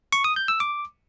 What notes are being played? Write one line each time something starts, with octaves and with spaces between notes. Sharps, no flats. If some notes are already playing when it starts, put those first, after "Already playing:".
C#6
D#6
G6
E6
D6